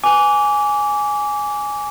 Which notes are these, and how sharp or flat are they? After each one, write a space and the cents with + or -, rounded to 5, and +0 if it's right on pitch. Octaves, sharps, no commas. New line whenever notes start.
G#5 +0 D6 -25